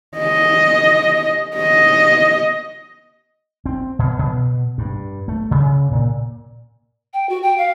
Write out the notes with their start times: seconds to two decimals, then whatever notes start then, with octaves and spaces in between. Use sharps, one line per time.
0.18 D#5
1.56 D#5
3.66 C4
3.99 B2
4.19 B2
4.78 G2
5.28 A3
5.51 C#3
5.91 A#2
7.14 G5
7.29 F#4
7.43 G5
7.58 F5